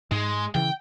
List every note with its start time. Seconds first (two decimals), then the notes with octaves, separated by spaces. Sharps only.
0.11 G#2 G#3
0.55 C#3 E3 G5